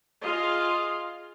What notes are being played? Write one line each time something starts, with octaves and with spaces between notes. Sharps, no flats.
F4 G#4 D#5 F5